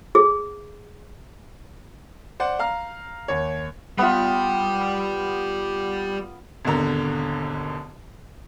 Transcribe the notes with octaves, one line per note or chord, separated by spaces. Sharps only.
G#4
C5 D5 F#5
F5 A#5 F6
D#2 C#5
G3 B3 F4 G4
G#1 D#2 B2 D3 A#5